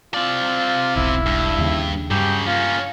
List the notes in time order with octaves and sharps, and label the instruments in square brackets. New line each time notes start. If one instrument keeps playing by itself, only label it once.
[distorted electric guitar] C4 D5 [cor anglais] F4
[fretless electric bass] E1 B1 [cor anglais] E4
[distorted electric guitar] G2
[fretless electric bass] D#2 C#3
[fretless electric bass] G2 [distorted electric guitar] C#3 F#3 [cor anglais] G4
[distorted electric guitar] A#3 C#4 [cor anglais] F4